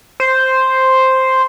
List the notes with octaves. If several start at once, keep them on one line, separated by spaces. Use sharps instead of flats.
C5